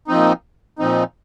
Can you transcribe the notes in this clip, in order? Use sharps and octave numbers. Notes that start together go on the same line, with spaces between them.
A#2 F3 C4 D#4
A#2 F3 C4 D#4